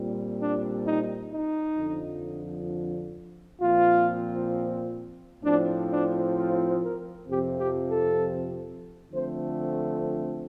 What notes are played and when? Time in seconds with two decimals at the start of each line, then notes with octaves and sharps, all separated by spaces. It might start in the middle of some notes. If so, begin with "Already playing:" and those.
Already playing: A#2 G3 C4
0.39 D4
0.84 D#4
1.30 D#4
1.77 F2 D3 F3
3.60 A#2 F3 C4 F4
5.44 A2 F3 C4 D4
5.89 D4
6.36 F4
6.82 A#4
7.28 F2 C3 F3 C4 G4
7.58 G4
7.89 A4
9.11 D3 F3 A3 C4 C5